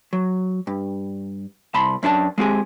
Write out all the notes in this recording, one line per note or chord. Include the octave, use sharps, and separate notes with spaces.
F#3
G2
C2 A5 B5 C6
F#2 D4 A#4 A5
G#3 C4 G4 G#4